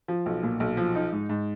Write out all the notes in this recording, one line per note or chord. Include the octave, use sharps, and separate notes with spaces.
F3
B1
A#2
B1
F3
D#4
G#2
G#2